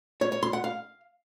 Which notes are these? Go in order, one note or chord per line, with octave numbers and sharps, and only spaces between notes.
C#5
C#5
C6
F#5
F5